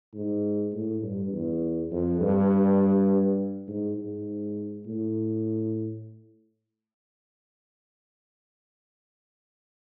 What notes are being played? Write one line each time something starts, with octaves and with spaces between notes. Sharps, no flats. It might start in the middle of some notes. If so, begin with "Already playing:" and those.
G#2
A2
G2
E2
F2
G2
G#2
G#2
A2